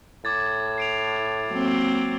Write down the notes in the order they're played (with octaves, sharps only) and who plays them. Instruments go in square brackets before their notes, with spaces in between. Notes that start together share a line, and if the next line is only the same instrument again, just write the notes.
[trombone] A2 [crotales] D6 G#6 A6
[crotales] C7 D7 F7
[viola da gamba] F#3 A#3 C4